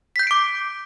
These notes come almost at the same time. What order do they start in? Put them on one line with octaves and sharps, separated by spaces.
B6 G6 C7 D7 D6